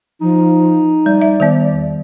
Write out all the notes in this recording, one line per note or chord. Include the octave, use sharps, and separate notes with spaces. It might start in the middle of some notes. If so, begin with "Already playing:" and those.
F3 D#4
G3 D5
E5
D#3 G3 B3
E2